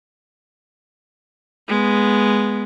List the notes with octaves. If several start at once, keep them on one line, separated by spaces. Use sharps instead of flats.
G#3 B3